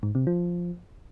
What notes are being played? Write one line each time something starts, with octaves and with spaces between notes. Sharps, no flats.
G#2
C3
F3